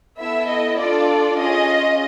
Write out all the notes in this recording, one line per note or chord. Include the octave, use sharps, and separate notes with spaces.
B3 E4 A4 E5
D#5
D4 F4 A4 D5
C#4 F4 G#4 D#5